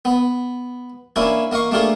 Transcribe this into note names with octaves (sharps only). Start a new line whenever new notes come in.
B3
A#3 C#4 D4 E4
A#3 D#5 F5 C#6
A3 A#3 D4 F4 G#4